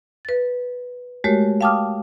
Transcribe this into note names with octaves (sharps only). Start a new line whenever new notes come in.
B4 A6
G#3 A3 F#4 G4 A#4 C#5
F5 G5 A5 D6 D#6 F6